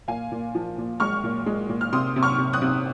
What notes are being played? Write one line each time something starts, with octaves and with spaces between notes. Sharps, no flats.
A#2 F5 G#5
A#2
F3
A#2
G#3 C#6 F6
A#2
G#3
A#2
F6
C3 C6 D#6
C3
C#6 F6
C3
D#6 F#6
C3